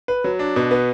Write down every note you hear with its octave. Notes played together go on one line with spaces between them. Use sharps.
B4
F#3
D4
B2
B3